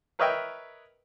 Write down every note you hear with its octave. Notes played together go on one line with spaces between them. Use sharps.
A#4 B4 C#5 D#5 E5 G5